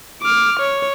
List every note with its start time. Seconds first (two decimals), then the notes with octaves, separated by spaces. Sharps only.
0.22 D6 F6
0.59 C#5